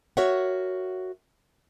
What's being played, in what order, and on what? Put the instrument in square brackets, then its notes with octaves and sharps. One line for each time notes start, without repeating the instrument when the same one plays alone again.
[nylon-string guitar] F#4 A#4 C#5 E5 F#5